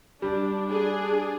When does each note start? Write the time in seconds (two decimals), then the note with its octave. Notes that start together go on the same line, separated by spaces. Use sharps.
0.22 G3 D4
0.70 D4 G#4